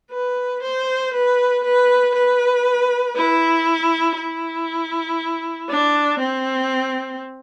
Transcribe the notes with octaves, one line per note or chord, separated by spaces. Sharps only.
B4
C5
B4
B4
B4
E4
E4
D4
C4